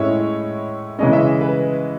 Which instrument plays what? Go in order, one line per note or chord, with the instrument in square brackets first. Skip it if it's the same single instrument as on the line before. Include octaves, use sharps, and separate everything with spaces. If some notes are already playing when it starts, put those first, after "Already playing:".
Already playing: [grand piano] A2 G#3 C#4 E4 C#5
C#3 E3 G#3 C#4 D#5
E5
B4